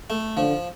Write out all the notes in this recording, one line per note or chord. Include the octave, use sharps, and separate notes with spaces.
A3
D3 F3